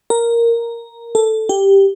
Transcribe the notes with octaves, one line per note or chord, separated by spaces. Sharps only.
A#4
A4
G4